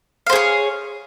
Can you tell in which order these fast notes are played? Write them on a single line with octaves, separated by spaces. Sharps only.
F5 C5 G#4 C#5